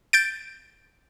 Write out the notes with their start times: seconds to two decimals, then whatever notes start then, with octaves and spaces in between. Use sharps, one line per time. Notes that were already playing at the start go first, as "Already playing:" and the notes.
0.13 G6 A6 D7